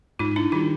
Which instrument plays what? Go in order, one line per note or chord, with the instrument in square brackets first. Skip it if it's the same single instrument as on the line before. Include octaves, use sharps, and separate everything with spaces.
[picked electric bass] G#2 [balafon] D#4 F4
[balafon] D4 E4
[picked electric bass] D#3 G3 [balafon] D#4 F4